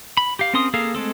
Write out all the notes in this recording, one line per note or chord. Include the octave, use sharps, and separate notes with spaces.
B5
G4 F5
C4 C#4 A#4 C6 D#6
A#3 G#4 A4 F5
G#3 A3 C4 A4